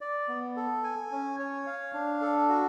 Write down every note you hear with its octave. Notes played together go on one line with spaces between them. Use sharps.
D5
B3
A4
G#5
C#4
C#5
F5
D4
A4
F#4